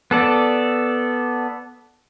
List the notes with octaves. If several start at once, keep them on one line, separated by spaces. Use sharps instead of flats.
B3 A4 D5